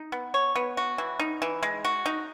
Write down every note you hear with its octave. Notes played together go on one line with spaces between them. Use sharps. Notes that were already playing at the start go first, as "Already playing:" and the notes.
Already playing: D#4
B3
C#5
B3
F#4
E3
D#4
E3
G#3
F#4
D#4